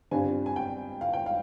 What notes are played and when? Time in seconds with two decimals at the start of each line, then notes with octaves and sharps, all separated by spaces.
0.11 G2 D3 G3 C4 F4 G#5
0.46 G#5
0.56 G5
1.01 F5
1.13 G5
1.26 F5